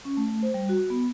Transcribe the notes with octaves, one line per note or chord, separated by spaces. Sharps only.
C#4
A3
C5
G3
F#4
B3